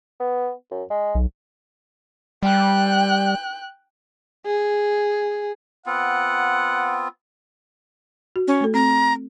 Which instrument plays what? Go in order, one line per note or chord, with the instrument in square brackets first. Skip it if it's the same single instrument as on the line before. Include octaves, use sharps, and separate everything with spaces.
[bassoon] B3
F#2
G#3
[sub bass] B1
[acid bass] G3 [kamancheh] G5 F#6
[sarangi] G#4
[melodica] B3 C4 F4 [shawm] F#5
[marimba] F#4
[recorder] C#4
[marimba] A3 A4
[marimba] C4 [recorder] A#5